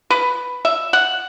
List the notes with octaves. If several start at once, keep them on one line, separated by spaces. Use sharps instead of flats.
B4
E5
F#5